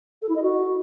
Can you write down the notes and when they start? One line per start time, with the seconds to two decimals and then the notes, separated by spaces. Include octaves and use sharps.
0.22 A4
0.29 E4
0.35 D#5
0.42 F#4